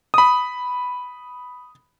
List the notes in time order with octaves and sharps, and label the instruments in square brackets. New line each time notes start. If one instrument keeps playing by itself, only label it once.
[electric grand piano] B5 D#6